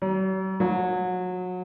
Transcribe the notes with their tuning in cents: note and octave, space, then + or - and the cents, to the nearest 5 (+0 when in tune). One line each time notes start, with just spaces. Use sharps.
F#3 +45
F#3 -30